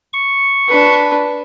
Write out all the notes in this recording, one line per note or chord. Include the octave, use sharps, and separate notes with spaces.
C#6
D4 B4